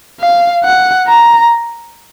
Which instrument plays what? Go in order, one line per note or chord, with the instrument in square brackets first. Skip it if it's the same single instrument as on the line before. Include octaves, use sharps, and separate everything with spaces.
[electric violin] F5
F#5
A#5